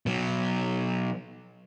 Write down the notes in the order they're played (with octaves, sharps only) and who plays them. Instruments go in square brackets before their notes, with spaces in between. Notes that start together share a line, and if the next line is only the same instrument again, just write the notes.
[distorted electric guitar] B2 F#3